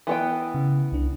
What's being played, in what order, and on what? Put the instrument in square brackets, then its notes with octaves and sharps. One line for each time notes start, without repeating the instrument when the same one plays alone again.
[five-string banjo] E3 B3 G5
[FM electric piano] C#3
C2 D4